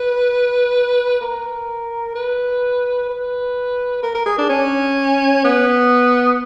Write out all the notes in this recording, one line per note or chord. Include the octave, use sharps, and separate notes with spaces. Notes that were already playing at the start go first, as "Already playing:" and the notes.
Already playing: B4
A#4
B4
B4
A#4
A#4
G#4
D4
C#4
B3